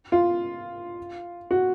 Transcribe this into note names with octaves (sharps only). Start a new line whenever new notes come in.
F4
F#4